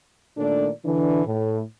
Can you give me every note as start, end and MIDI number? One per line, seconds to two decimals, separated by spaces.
0.37 0.68 46
0.37 0.68 51
0.37 0.68 57
0.37 0.68 62
0.37 0.68 69
0.37 0.68 74
0.85 1.25 50
0.85 1.25 52
0.85 1.25 62
1.26 1.60 45